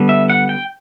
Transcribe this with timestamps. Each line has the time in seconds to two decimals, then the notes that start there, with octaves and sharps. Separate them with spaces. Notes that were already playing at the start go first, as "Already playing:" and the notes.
Already playing: D3 G3 B3
0.09 E5
0.30 F#5
0.49 G5